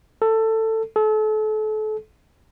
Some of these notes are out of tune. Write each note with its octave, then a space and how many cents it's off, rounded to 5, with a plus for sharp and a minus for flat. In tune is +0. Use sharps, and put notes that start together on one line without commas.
A4 +15
A4 -35